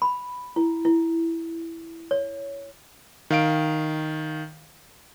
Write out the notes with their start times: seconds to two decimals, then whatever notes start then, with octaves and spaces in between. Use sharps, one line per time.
0.02 B5
0.56 E4
0.85 E4
2.11 C#5
3.30 D#3 F5 D7